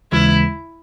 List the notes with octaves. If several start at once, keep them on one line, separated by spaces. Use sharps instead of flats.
D#2 C#3 E3 G#3 E4